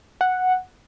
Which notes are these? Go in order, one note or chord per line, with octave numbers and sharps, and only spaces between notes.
F#5